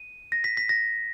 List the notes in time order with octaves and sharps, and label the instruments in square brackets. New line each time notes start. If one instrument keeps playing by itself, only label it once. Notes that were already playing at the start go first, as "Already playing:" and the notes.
Already playing: [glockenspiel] D#7
A#6
B6
B6
A#6